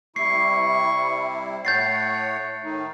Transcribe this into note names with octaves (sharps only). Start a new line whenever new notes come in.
C3 G3 E4 C#6 C7
A2 A3 C#5 F#5 G6 A6 C7
A2 D#3 A3 D#4